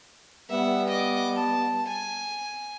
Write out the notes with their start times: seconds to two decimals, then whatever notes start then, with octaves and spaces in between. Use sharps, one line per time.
0.50 G3 B3 E5 F#5
0.89 D#5 D6
1.35 A5
1.87 G#5